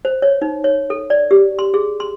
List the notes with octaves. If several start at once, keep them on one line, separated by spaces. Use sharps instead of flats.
C5
C#5
D#4
C#5
A4
D5
G4
C6
G#4
C6